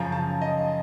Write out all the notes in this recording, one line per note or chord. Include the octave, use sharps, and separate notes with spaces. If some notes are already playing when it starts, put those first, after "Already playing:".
Already playing: F#2 C#3 F3 A#5
A5
D#5